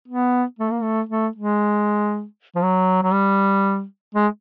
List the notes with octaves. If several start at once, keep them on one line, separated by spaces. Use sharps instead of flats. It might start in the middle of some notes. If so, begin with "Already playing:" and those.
B3
A3
A#3
A3
A3
G#3
F3
F#3
F#3
G3
G#3